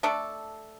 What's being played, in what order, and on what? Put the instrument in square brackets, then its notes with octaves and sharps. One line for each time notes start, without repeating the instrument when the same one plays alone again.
[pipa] A3 D4 A4